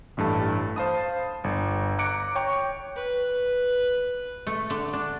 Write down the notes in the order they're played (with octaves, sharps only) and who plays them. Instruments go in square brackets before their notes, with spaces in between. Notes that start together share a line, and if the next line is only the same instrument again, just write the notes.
[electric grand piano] A1 G2 A3 A5
C5 F5 A5 B5 D#6
G1
A#5 D6 F#6 C#7 D7
C#5 G5 C#6
[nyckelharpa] B4
[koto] A3
D3
D4